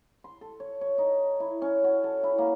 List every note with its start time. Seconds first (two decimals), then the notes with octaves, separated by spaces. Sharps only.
0.24 C6
0.41 A4
0.60 C#5
0.81 C#5
0.98 D#4
1.40 E4
1.62 C#4
1.84 F#4
2.04 A4
2.23 E4
2.38 A#3